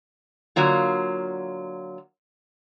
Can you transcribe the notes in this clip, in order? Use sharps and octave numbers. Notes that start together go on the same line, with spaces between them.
D3 F#3 A#3 F4